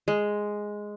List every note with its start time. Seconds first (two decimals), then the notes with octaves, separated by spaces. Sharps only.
0.08 G#3